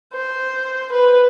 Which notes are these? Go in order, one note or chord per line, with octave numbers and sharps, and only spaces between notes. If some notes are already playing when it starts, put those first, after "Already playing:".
C5
B4